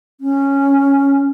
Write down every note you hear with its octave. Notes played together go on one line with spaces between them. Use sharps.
C#4